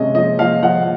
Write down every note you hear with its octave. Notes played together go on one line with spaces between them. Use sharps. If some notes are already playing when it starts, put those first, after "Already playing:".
Already playing: C3 G#3 C#4 D#5
F3 D#5
F3 F5
F3 F#5